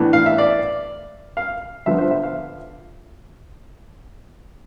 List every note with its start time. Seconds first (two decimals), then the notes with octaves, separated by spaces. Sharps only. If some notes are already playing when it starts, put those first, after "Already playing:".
Already playing: A2 E3 B3 D4
0.13 F5
0.26 E5
0.38 D5
1.37 F5
1.86 D3 F3 B3 E5
1.98 C5
2.11 E5
2.23 F5